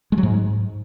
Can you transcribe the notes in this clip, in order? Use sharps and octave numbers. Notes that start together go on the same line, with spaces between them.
G#3
F#3
G#2